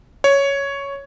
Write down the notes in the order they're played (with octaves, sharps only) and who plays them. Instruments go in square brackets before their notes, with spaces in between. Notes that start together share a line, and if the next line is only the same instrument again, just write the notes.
[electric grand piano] C#5